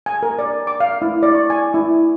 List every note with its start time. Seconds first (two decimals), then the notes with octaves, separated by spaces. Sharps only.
0.06 G#5
0.23 A#4
0.39 D5
0.67 D6
0.80 F5
1.02 E4
1.23 D5
1.35 C#6
1.50 G#5
1.74 E4